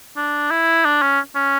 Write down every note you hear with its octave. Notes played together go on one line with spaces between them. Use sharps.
D4
E4
D4
C#4
C#4